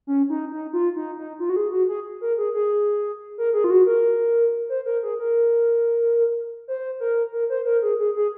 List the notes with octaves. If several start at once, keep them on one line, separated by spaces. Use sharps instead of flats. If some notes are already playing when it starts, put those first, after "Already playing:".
C#4
D#4
D#4
F4
D#4
D#4
F4
F#4
G#4
F#4
G#4
A#4
G#4
G#4
A#4
G#4
F4
F#4
A#4
C5
A#4
G#4
A#4
C5
A#4
A#4
C5
A#4
G#4
G#4
G#4